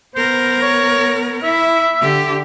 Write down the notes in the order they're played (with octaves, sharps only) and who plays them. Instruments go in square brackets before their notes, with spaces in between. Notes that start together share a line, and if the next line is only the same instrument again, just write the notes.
[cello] B3 A#4 [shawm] C5
[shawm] C#5
[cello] E4 [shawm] E5
[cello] D3 G4